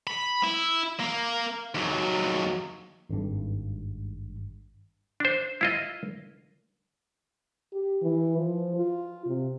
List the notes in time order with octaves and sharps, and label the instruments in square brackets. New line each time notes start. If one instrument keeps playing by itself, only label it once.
[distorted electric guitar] B5
E4
A#3
D#2 F#3
[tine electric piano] G#1 G2
[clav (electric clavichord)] D4 C5
E4 F4 D#5
[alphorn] G4
E3
F3
F4
C3